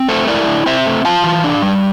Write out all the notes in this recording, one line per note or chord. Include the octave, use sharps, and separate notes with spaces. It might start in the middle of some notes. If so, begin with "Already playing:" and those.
Already playing: C4
A3 A4 C5
E4 A#4 D5
D3
C4 C5 E5
A3
F4 F5 A5
E3
D4
G3